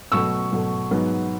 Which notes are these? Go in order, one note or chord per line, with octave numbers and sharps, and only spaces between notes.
B2 F#3 A3 C#6 E6
B2 F#3 A3
G#2 F#3 B3